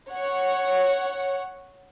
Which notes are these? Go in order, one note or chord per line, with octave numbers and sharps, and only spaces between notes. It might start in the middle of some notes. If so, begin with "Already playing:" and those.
C#5 F#5